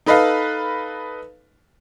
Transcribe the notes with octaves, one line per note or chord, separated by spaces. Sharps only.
D#4 A4 B4 D#5 F5